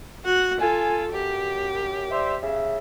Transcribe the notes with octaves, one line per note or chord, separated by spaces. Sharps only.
F#4 F#5
F4 A4 G#5
F#2 G4
C5 D5 E5
C#3 E5